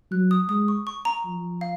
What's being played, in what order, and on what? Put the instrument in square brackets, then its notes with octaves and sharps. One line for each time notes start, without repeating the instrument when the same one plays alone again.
[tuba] F#3 [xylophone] F#6
[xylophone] D#6
[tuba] G#3 [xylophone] D#6
[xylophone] C#6
C#6
A#5
[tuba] F3
[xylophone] F5